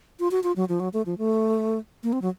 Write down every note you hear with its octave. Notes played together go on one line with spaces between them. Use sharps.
F4
F#4
F4
F#3
F3
F#3
A3
F3
A3
A#3
C4
F#3